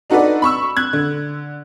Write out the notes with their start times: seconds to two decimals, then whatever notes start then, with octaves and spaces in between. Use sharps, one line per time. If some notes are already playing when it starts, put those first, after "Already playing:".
0.10 D4 D#4 F#4 A4 B4 D5
0.42 B5 C#6 E6
0.76 F#6 G#6
0.93 D3